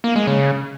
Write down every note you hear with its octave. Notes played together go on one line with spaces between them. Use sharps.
A#3
G#3
C#3